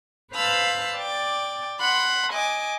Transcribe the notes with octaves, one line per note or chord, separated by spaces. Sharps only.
B4 C5 F5 A5 B5 E6
D5 G5 A6
F#5 B5 C6
D#5 G#5 D6